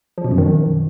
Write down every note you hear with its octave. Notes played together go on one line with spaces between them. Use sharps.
F3
B2
F#2
D#3